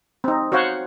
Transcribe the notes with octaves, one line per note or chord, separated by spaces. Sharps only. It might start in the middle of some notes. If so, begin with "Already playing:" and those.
C4 D#4
F#4 C5 C#5 F5 F#5